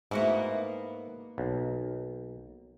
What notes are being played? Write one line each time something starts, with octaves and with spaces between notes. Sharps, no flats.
G#2 A#3 B3 E4 F#4
B1